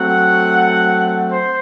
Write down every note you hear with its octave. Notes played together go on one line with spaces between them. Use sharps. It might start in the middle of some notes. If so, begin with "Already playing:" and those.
Already playing: F#3 A3 C4 F#5
C5